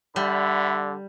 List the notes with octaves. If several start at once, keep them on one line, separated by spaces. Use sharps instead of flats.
D3 G3 E5 F#5 B5